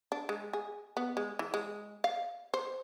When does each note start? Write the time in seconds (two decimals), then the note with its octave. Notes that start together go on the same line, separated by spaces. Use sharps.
0.12 D4
0.29 G#3
0.53 G#4
0.97 B3
1.17 G#3
1.39 E3
1.54 G#3
2.04 F5
2.54 C5